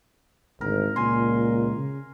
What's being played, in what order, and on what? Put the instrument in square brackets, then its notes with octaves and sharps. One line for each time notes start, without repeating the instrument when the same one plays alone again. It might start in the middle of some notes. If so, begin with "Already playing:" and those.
[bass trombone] G#1 [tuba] D2 [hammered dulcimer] A#4
[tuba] C#2 [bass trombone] A#2 [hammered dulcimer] G#5 C6
[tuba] C#3